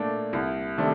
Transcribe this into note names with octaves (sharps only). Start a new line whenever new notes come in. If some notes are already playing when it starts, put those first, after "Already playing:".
Already playing: A#2 A3 A#3 D4
C2
C3 D#3 A3 D4